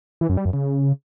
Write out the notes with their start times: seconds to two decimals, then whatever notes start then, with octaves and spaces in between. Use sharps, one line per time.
0.21 E3
0.29 F#2
0.37 G3
0.45 F#2
0.53 C#3